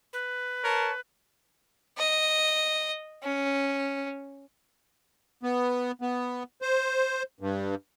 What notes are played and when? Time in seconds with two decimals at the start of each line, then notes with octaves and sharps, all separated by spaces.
0.13 B4
0.64 A#4 C#5 A5
1.98 D#5
3.23 C#4
5.43 B3
6.02 B3
6.62 C5
7.41 G2